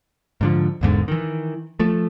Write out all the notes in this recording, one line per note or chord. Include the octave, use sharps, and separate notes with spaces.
G#2 D3 F3
G#1 E2 G#2 D3
D#3 E3
F3 A3